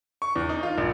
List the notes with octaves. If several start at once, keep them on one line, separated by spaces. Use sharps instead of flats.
C#6
E2
D#4
F4
A#1